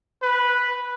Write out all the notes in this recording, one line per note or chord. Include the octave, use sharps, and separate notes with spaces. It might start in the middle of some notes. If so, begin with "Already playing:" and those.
B4